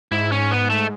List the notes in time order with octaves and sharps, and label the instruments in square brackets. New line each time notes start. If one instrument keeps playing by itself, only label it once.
[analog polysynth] G#2 [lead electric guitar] E4
[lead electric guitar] C#4
B3
A3